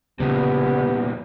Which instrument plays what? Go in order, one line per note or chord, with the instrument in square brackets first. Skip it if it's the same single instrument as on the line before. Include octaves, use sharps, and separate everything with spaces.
[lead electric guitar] E2 A#2 [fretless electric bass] C#3 [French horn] B3 [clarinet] G4